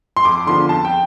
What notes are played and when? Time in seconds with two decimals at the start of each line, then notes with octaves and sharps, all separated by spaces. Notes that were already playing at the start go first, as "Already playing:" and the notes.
0.17 C6
0.25 F2 D6
0.47 D3 F3 B3 C6
0.69 F2 A5
0.85 G5